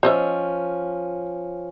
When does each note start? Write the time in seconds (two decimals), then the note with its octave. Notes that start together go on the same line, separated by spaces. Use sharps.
0.03 F3 C#4 C5 D#5 E5